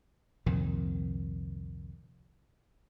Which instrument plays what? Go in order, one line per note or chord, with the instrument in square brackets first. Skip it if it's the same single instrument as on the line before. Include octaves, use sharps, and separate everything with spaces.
[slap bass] C2 F2 A#2 D#3